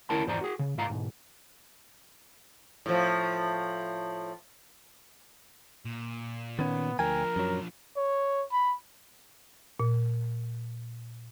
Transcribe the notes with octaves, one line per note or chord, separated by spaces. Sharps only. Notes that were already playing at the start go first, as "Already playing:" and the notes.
D2 C#4 E4 A#4 A5 B5
E2 G#2 F4 C5 D5 A#5
F#4 G#4
C#3
G#2 F4 F5 A#5
B1 G#2
A2 F3
A#2
D#3 B3 C#4
D2 F3 D4 A#4 G5 G#5
F#2 F#3
C#5
B5
A#2